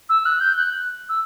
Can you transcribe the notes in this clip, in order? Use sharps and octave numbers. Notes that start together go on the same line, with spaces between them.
E6
F#6
G6
F#6
E6